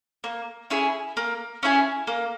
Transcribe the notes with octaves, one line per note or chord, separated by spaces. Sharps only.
A#3
C#4 E4 G#4
A#3
C#4 E4 G#4
A#3